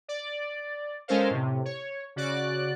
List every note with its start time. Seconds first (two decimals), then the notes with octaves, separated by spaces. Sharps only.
0.08 D5
1.08 G#3 C#4 A4 A#4 C5 F5
1.31 A2 C3
1.65 C#5
2.16 C#3 F#4 D5 F#6